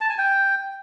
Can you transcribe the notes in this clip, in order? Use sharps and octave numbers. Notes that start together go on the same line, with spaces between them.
A5
G#5
G5